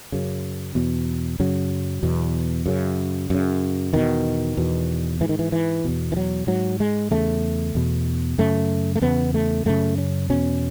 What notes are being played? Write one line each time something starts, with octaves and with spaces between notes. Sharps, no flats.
F#2 C#3
E2 B2
F#2 C#3 F#3
E2 B2
F#2 C#3
F#2 C#3
E2 B2 D#3
E2 B2
G#2 E3
D#3
E3
E3
E2 B2
E3
F#3
G#2 F#3
G#3
E2 C#3 A3
E2 B2
F#2 C#3 A3
A3
E2 C#3 B3
A3
F#2 C#3 A3
C#4
E2 B2 C#4